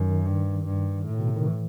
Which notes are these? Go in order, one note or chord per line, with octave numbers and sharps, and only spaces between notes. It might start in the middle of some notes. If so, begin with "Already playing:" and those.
Already playing: F#2 D#3
G2
G2
A2
B2
C3
D#3
E3